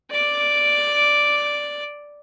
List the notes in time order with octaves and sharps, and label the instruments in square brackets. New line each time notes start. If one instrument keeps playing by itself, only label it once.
[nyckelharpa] D5 D6